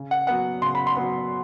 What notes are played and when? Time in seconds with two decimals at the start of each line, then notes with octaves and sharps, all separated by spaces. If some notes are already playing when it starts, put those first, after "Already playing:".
Already playing: C#3
0.11 F#5
0.27 F#3 B3 F#5
0.62 C#3 C6
0.75 B5
0.87 C6
0.97 F#3 B3